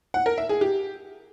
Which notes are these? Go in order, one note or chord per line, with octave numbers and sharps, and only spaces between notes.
F#5
A#4
E5
G#4
G4